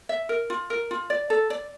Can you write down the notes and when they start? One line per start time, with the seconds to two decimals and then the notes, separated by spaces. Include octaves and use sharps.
0.09 E5
0.29 A#4
0.50 F4
0.70 A#4
0.91 F4
1.10 D5
1.30 A4
1.50 D5